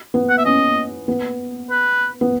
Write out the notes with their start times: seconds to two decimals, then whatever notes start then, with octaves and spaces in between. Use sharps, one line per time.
0.14 B3
0.29 F#5
0.38 E5
0.45 C#4 D#5
1.08 B3
1.70 B4
2.21 B3